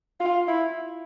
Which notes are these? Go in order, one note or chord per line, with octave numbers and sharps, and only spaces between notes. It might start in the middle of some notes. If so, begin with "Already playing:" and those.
F4
E4